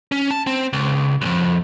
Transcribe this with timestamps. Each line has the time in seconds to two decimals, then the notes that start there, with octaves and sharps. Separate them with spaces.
0.12 C#4
0.31 A5
0.47 C4
0.73 C#2
1.22 B1 F2